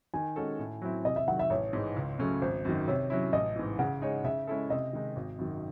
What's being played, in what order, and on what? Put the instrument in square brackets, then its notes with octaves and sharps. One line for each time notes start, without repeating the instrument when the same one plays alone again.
[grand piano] D#3 [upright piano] G#5
[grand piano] G#3 C#4 F#4 A4
A2
F#3 C4 E4
[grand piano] C3 [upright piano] D#5
[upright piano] E5
[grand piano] D#3 F#3 [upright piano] F#5
[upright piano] E5
[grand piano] A1 [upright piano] C#5
[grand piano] G#2 E3 G#3
C#2
C#3 F#3 A3 C#4
[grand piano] G#1 [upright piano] C5
[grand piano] F#2 D#3
[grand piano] C3 [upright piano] C#5
[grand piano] F#3 C#4 E4
[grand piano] A1 [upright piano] D#5
[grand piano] G#2 E3
[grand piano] C#3 [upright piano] F#5
[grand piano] G#3 D#4 G#4 C#5
[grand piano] C#3 [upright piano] E5
[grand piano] G#3 C#4 E4 A4
[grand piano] C3 [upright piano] D#5
[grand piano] D#3 G#3 D#4
G#1
F#2 D#3